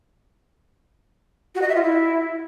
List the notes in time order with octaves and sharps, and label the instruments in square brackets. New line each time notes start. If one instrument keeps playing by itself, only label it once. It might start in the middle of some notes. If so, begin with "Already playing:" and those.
[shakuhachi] F#4
D#5
E5
F4
E4